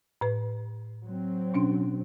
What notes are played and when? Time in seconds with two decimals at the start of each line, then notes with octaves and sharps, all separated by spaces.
0.21 A2 B4
1.04 F#3 C4
1.54 B2 C#4 D4